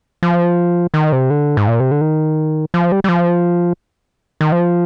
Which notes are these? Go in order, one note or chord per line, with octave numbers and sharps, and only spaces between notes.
F3
D#3
C3
D3
G#2
A#2
C3
D3
D#3
F3
G3
G3
F3
D#3
F3